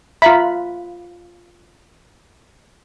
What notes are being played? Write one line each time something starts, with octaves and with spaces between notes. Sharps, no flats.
F4 E5 A#5 B5